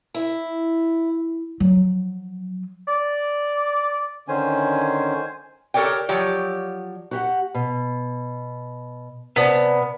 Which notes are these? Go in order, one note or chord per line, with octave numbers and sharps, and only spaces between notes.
E4
F3 F#3
D5
D3 D#3 C#4 C5 G#5
G4 A4 A#4 C#5 D5 G5
F3 F#3 G4 C#5 D5
F#4 G4 F#5
B2
C3 B3 D5 A5